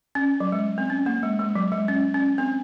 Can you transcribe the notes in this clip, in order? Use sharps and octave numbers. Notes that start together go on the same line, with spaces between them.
C#4
F#3
G#3
C4
C#4
A#3
G#3
G#3
F#3
G#3
C#4
C#4
C4